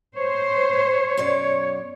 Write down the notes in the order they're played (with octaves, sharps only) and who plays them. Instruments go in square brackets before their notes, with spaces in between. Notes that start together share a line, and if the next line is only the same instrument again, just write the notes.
[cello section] C5 [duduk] C#5
[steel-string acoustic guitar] F#2 B2 D5